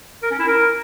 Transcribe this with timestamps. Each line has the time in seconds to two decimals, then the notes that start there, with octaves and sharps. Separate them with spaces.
0.23 A#4
0.31 C#4
0.39 E4
0.47 A#4